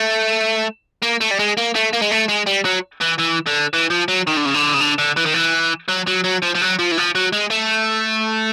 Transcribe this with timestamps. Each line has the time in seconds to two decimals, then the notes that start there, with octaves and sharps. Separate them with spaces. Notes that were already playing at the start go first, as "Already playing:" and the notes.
Already playing: A3
1.03 A#3
1.21 A3
1.31 G3
1.39 G#3
1.57 A#3
1.75 A3
1.93 A#3
2.01 G#3
2.11 A3
2.28 G#3
2.46 G3
2.65 F#3
3.01 E3
3.18 E3
3.46 D3
3.74 E3
3.90 F3
4.08 F#3
4.27 D#3
4.37 D3
4.45 C#3
4.54 D3
4.74 C#3
4.80 D3
4.98 D3
5.17 E3
5.26 D#3
5.34 E3
5.89 F#3
6.08 F#3
6.24 F#3
6.43 F3
6.55 F3
6.62 F#3
6.79 F3
6.91 E3
6.98 F3
7.15 F#3
7.33 G#3
7.50 A3